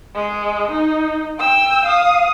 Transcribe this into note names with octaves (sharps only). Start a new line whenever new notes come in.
G#3
D#4
G5 E6
F5 D#6